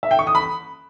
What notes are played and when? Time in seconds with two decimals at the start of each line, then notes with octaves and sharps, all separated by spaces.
0.03 E5
0.11 G5
0.19 C#6
0.27 D#6
0.35 B5